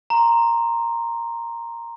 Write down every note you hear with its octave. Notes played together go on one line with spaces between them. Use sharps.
A#5 C6